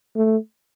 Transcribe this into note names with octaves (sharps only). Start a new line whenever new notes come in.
A3